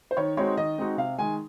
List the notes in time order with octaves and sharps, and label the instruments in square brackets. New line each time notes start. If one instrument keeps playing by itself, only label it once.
[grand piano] C5
[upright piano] D#3 [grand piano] C#5
[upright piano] G#3 C4 D#4 F#4 [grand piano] C#5
[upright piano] D#3 [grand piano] D#5
[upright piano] G#3 C4 D#4 F#4
[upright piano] C3 [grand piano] F5
[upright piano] D#3 G#3 [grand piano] G#5